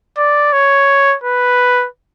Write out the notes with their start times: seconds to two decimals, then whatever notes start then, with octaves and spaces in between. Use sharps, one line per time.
0.18 D5
0.53 C#5
1.24 B4